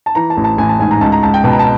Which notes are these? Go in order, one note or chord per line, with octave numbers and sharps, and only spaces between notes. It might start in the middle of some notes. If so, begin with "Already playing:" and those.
A5
E3 A#5
A5
A1
A5
A1 G#5
A5
G#2 G#5
A#5
C#2 A5
A#5
C#2 A5
G5
B2 A5
A#5
A5